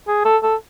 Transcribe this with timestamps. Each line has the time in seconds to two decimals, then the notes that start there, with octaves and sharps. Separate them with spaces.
0.08 G#4
0.25 A4
0.43 A4